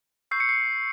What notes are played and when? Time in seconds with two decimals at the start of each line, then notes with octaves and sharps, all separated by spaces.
0.31 C#6 E6 G6 C7
0.40 C#7
0.49 C7